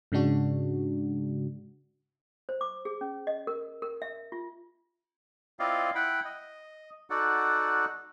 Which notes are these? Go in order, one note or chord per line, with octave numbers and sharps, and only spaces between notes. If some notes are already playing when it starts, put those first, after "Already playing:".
G#2 C#3 G#3 D4 F#4
C5
D6
G#4
C#4
D#5
A#4
A#4
E5
F4
C4 E4 F4 D5 D#5 F5
E4 F#5 G5 B5
D#5
D#4 F#4 A4 D5 F#5